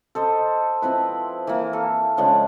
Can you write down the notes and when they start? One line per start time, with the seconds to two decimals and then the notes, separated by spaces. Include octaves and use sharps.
0.15 A4 C5 D#5
0.82 F3 C4 E4 B4
1.47 E3 A#3
1.73 A4 F5 C#6
2.17 C#3 F3 G#3 D4